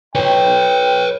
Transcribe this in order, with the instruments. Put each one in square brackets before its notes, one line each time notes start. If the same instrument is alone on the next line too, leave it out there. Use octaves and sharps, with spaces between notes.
[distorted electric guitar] B4 C#5 [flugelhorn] G5